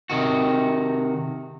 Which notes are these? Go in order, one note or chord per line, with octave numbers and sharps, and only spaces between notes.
C3 D#3 F#4